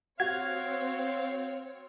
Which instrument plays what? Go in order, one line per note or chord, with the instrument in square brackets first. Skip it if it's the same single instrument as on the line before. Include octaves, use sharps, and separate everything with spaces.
[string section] C4 C#5 [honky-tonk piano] F#4 [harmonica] F5 [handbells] G#6